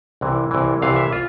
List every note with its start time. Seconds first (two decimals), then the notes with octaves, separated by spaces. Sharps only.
0.21 C2 C3 E3
0.51 C2 C3 E3
0.82 C2 C3 E3 F5
0.96 E5
1.13 F4